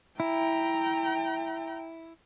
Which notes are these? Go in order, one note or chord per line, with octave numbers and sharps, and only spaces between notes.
E4 G5 A#5